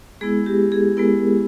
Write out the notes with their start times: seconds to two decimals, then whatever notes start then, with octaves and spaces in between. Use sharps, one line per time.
0.21 G#3 B3 E4 G#4
0.46 G4
0.72 G#4
0.97 G#3 B3 E4 A#4